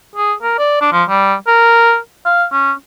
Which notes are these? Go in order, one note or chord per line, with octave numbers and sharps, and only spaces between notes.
G#4
A#4
D5
D4
F3
G3
A#4
F5
C#4